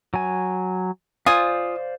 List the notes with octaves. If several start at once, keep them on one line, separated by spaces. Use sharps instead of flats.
F#3 G#5
F4 C5 D5 F5 G#5 D#6